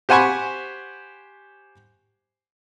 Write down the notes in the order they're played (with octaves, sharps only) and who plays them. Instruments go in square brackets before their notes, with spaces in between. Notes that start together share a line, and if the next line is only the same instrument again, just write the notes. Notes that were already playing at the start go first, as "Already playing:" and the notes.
[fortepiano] G4 C5 F#5 G#5 B5 C#6